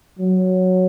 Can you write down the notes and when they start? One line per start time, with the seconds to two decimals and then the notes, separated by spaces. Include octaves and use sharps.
0.19 F#3